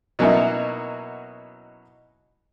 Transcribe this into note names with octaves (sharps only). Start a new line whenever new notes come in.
B2 F#3 A#3 C#4 D#4 E4